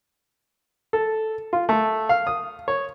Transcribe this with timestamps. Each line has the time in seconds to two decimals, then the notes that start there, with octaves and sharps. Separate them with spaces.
0.93 A4
1.53 F4
1.69 A3
2.09 F5
2.27 D#6
2.68 C#5